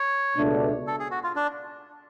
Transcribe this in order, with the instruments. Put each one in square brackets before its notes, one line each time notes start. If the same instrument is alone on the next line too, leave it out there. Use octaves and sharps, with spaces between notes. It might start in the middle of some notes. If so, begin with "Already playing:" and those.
Already playing: [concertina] C#5
[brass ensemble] C#2 B2 A3 D4
[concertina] A4
G#4
F#4
F4
D4